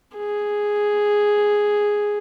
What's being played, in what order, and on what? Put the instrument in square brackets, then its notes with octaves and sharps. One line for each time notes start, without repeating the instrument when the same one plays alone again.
[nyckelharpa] G#4